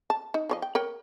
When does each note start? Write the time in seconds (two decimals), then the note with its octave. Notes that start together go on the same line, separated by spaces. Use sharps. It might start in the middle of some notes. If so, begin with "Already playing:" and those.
0.10 A5
0.34 D#4
0.49 F3 C#5 D#5
0.62 G5
0.75 A#4 C#5 G5